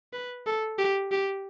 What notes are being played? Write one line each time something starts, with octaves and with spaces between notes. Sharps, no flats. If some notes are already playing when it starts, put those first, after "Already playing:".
B4
A4
G4
G4